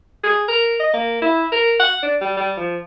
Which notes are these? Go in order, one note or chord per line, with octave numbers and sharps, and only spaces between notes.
G#4
A#4
D#5
A#3
E4
A#4
F#5
D4
G3
G3
F3